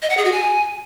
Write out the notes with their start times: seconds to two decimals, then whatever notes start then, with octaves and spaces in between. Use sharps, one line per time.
0.02 D#5
0.10 F#5
0.17 G#4
0.25 F#4
0.32 G#5